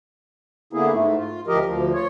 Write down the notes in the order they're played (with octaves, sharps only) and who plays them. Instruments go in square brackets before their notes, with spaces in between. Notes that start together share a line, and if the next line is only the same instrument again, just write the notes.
[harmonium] D3 A#3 B3 E4 G#4
G#2 A3
F4
D2 F3 G4 A#4 D#5
D2 F3
F4 C#5